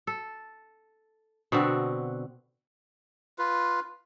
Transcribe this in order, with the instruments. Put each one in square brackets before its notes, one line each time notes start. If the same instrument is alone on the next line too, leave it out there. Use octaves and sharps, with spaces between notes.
[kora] A4
B2 D3 C4 F#4
[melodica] F4 B4